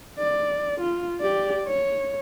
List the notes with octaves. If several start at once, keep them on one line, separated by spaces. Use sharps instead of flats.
D5
F4
G4 D5
C#5